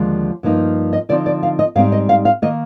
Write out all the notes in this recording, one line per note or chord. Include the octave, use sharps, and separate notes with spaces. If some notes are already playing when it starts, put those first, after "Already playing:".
Already playing: D#2 D3 F3 G#3
G2 F3 A#3 D#4
D#5
D3 F3 C4 D#4 D5
D5
F5
D#5
G#2 G3 C4 D#4 F5
D#5
F5
F5
D#3 A#3 D#5